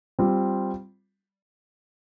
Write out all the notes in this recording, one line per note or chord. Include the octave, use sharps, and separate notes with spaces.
G3 C4 F4